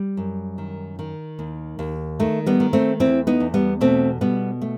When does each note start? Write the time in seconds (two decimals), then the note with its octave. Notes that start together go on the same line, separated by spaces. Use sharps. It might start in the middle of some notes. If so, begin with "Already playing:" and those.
Already playing: G3
0.17 F#2
0.58 D#3
0.99 D#3
1.39 D#2
1.79 D#2
2.20 D#3 A3
2.46 G3 B3
2.60 D#3
2.73 A3 C4
3.00 E2 C4 E4
3.27 B3 D#4
3.40 E2
3.54 G3 B3
3.81 B2 A3 C4
4.21 B2 G3 B3
4.61 A3